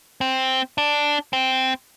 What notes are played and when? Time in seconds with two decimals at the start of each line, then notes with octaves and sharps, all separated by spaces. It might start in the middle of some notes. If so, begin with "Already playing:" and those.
0.21 C4
0.78 D4
1.33 C4